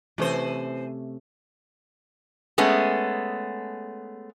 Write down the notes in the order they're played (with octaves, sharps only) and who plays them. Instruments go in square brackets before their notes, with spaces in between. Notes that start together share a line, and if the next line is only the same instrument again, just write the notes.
[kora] C3 A3 C#4 [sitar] E3 C5
[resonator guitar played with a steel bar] G#3 A3 B3 C#4 G#4